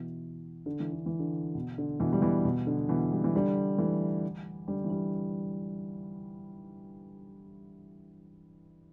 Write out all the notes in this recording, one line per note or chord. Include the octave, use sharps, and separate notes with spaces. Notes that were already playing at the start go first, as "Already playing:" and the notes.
Already playing: B2 E3
D3
E3
D3
E3
D3
B2
D3
B2 E3
G3
B2 E3
B2
D3
B2 E3
G3
E3
D3 G3
E3 A3
D3 G3
E3
D3 G3